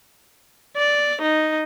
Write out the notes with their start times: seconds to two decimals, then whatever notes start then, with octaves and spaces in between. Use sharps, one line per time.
0.77 D5
1.22 D#4